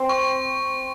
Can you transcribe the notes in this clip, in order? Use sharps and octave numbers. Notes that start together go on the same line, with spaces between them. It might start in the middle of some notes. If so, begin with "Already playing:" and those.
Already playing: C4
C#6